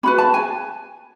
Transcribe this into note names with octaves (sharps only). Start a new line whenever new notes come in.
C#4 F#4 B4 B5
A5
G#5